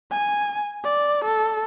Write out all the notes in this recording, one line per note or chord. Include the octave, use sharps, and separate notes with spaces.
G#5
D5
A4